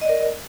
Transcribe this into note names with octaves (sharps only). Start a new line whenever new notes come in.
A#4 D5 D#5